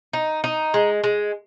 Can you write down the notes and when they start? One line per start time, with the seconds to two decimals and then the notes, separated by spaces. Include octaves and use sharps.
0.13 D#4
0.44 D#4
0.74 G#3
1.04 G#3